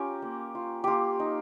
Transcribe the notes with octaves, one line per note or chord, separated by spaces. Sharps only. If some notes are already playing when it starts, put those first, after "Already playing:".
Already playing: C#4 F4 G4 A#4
A#3
F4
A#3 F4 G4
D#4